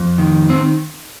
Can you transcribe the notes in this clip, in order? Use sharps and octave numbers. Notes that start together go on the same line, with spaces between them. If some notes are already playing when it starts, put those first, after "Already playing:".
Already playing: F2
D#3
D#3 C4